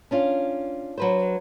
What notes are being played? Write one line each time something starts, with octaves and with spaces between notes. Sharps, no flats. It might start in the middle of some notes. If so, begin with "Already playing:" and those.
C#4 D4 F4
F#3 B4 C5